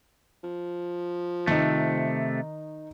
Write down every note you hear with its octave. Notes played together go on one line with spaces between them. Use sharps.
F3
C3 D#3 A3 D#4